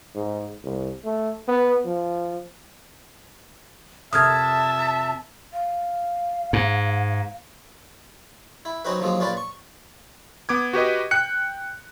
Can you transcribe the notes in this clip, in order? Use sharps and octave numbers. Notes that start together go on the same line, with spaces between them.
G#2
C2
A3
B3
F3
F2 C3 A#4 E5 A5 D#6 F6 G#6
F5
G#2
E4
F#3 C4 C#4 D#4 F#4 B4
D#2 F3 F#3 G#3
A#1 C#4 F4 B4 D5
C#6
B3 D6 G#6
F#4 G4 B4 D#5
G5 F#6 C#7